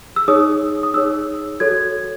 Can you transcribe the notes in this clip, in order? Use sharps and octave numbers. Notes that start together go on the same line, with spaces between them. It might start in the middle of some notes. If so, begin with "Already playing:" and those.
E6
D#4 G#4 C#5 D#6
D#6
D#4 G#4 C#5 E6
F#4 A4 C#5 G#6